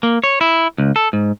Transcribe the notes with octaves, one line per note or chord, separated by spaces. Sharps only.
A#3
C#5
E4
C#2
A4
G#2